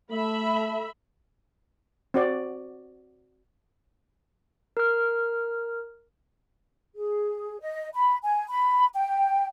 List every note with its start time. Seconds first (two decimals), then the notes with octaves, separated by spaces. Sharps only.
0.11 A3 E5 B5
2.14 C4 F#4 D5
4.77 A#4 F6
6.96 G#4
7.61 D#5
7.94 B5
8.24 G#5
8.49 B5
8.95 G5